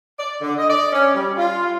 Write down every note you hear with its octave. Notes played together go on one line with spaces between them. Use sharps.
D5
D3
D#5
D5
C#4
G3
F4